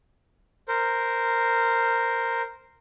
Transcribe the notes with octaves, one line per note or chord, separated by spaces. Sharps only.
A#4 C5